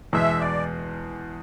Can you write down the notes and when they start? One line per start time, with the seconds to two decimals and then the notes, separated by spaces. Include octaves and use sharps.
0.13 E2 B2 G#3 E5
0.40 D5